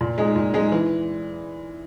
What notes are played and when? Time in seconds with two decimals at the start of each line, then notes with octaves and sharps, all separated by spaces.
0.01 A#2
0.18 G#3 D#4 G#4
0.36 A#2
0.54 G#3 D#4 G#4
0.72 E3